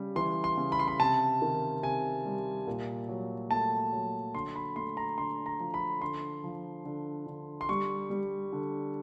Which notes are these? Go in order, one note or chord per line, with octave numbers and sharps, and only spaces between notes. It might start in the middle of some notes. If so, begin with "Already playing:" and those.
Already playing: C#3 G3
E3 C6
C6
C#3
B5
C6
B5
C3 A5
D#3
C3 G#5
G3
A#2
F#3
A3 A5
F#3
D3 C6
B5
A3 C6
A#5
D3 C6
A#5
F3
B5
D3 C6
F3
D3
D3
C6
G3 C#6
G3
D3